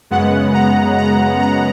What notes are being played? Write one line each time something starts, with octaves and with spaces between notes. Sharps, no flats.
F#2 C#3 G#3 B3 F#5
A#5
A#5
A#5